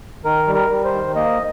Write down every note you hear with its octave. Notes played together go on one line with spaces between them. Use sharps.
D#3 A#4
G3
A#4
G3
C5
D#3
A#3 D#5